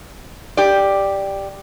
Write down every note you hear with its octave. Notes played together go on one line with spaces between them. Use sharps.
G4 D5